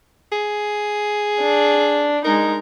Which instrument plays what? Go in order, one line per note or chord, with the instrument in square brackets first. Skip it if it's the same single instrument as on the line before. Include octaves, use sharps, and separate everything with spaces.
[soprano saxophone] G#4
[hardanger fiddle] D4
[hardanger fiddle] G#3 D#4 [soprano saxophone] A#4